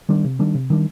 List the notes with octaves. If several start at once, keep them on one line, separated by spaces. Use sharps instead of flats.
D#3 G3 D4
C3
D#3 G3 D4
C3
D#3 G3 D4